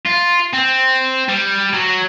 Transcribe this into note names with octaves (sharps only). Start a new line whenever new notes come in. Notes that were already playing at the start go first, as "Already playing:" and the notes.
F4
C4
G3
F#3